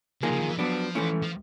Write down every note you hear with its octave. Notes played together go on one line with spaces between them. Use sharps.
D3 F3 A#3 D#4 G#4
C#3
D#3
E3
F3 F#3 B3 D4
E3 A3 C#4 E4
F3